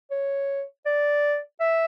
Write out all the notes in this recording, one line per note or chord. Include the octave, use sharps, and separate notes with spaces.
C#5
D5
E5